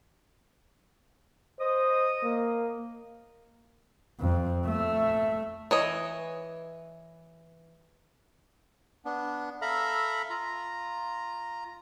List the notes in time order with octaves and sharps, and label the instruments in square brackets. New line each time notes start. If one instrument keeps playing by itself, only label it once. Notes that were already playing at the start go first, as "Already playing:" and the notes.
[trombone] C5 [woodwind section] D#5 D#6
[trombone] A#3
[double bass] F2
A3
[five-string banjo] E3 C#5 D#5
[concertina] B3 D4
A4 E5 F5 A#5 B5
F4 A#5